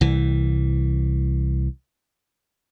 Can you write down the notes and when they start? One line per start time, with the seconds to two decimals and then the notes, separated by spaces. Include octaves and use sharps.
0.01 C2 E3